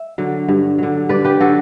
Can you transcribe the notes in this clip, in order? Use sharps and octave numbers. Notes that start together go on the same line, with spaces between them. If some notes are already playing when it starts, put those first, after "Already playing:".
Already playing: E5
D3 F#3
G2
D3 F#3
G2 B4 D5
G4 B4
D3 F#3 F#4 A4